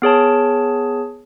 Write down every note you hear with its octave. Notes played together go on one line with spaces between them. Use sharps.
B3 G#4 C#5 A5